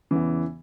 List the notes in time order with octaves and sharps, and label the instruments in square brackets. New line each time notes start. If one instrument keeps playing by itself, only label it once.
[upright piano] E2 C#3 E3